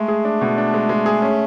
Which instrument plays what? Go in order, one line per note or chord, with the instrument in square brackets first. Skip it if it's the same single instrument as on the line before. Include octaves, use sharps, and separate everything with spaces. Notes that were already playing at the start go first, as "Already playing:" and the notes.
Already playing: [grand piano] G#3 [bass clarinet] A3
[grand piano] G#4
D4
B2
D4
G#3
G#3
G#4
C#4